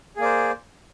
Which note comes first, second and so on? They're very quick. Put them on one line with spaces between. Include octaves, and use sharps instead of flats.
G#4 A#3 D5 C5